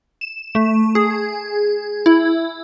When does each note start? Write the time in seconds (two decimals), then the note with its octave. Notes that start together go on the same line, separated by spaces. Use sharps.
0.21 E7
0.55 A3
0.95 G#4
2.06 E4